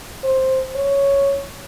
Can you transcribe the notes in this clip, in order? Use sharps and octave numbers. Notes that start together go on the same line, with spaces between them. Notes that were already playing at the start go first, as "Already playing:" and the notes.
C5
C#5